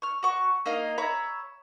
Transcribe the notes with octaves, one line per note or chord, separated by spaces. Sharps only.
C#6 F6
F#4 C#6
A#3 D#4 D#5 F5
C#5 E5 A#5 B5